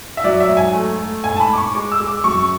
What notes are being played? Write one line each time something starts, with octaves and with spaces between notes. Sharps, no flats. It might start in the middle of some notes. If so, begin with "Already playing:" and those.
E5
F#3 D5
E5
G#2
G#5
A3
A3
G#2 G#5
A5
B5
G#2 D6
C#6
G#3 D6
E6
G#3
D6
F#2 C#6